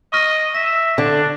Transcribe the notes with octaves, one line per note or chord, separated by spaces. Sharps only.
D#5 C#6 F6 A#6
E5 A#6
D3 D4